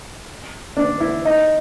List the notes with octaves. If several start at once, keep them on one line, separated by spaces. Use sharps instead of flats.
D4
E4
D#4